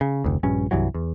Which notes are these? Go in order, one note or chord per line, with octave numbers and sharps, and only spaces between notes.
C#3
F1 D2
A#1 G2 C#4
C2 G2 E3 F#3
E2